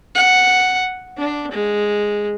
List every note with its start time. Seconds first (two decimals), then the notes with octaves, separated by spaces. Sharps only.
0.15 F#5
1.18 D4
1.51 G#3